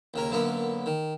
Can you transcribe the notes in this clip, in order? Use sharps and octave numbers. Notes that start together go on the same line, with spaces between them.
D#2 C#3 A#4
F#2 D3 A#3 B3
D#3